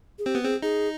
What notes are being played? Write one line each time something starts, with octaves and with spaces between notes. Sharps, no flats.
G#4
C4 G4
B3
C4 G#4
D#4 G#4